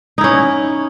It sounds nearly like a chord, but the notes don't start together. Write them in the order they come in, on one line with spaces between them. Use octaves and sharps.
D#4 E4 C#4